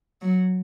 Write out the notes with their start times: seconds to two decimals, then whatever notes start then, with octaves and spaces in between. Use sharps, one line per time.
0.22 F#3